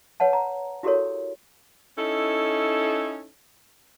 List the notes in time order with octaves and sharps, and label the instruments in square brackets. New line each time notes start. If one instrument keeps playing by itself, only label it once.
[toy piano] B4 C#5 F#5 A5
A#5
E4 F#4 G4 A4 A#4 C#5
[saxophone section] C#4 D#4 E4 A4